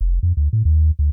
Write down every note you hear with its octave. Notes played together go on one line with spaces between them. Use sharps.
F1
F2
D2
A2
D#2
D2